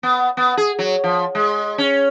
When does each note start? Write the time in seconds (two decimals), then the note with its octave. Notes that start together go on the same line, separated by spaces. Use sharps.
0.03 B3
0.37 B3
0.57 G#4
0.79 F#3
1.04 F3
1.35 G#3
1.78 C#4